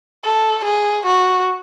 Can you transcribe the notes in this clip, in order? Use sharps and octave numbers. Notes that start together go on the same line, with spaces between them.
A4
G#4
F#4